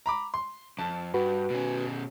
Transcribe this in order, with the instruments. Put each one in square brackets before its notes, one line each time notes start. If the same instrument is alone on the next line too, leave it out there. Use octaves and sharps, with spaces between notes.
[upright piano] A#5 B5 D6
C6
[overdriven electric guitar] F2 [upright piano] A5
[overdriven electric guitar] G2 [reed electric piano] F#4 B4
[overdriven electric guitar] B2 C#4